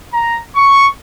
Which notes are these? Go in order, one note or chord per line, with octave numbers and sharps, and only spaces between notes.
A#5
C#6